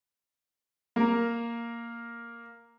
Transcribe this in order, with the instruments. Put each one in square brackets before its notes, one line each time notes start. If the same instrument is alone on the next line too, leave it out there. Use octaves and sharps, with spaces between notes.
[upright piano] A#3 A#4